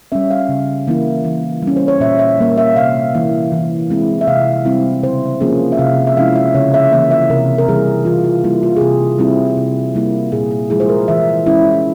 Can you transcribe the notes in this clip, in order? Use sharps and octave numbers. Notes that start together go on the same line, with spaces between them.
G3 C#4 E5
F5
C#3
E3 A#3 E4
E3
G3 C#4
C5
C#5
A#2 E5
E5
G3 A#3
E5
C3 F5
E3 A#3 E4
E3
G#3 C4 E4
E5
C3 F5
G3 C4 E4
C#3 C5
F3 A#3 C#4 G#4
E5
C3 F5
E5
F3 G#3 C#4 E4 F5
E5
C#3 C#5
E5
E3 A#3 E5
E5
C3 A#4
A#4
E3 G3 G#4
E3 F4
F4
G3 A#3 E4
F4
G#4
C3 G4
G3 C4 E4
C3
G3 A#3 E4
A#2 G#4
G#4
F3 G#3 E4 G#4
C5
A#4
E3 E5
G#3 C#4 E4